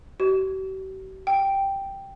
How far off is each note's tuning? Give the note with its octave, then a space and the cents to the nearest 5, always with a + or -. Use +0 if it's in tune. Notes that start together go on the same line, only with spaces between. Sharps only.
G4 -45
G5 +0